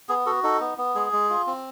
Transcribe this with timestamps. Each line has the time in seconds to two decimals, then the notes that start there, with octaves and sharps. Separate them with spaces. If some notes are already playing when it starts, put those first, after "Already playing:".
0.09 B3 G#4
0.26 F#4 A4
0.43 D#4 A4
0.60 B3
0.78 B3
0.95 G#3 G#4
1.13 G#3
1.30 F4
1.47 C4